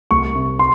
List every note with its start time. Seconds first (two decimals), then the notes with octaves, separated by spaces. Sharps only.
0.11 C2 C#6
0.35 C3
0.59 C6